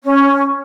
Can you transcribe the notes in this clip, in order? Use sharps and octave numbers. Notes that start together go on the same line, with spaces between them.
C#4